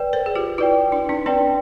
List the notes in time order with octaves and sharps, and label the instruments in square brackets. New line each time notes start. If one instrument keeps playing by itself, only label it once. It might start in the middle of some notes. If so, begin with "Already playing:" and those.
Already playing: [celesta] B4 D5 G5
[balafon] A#4 C5
G#4
F4 G4
[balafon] E4 F#4 [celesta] B4 D5 G5
[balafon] D4 E4
C#4 D#4
[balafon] C4 D4 [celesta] B4 D5 G5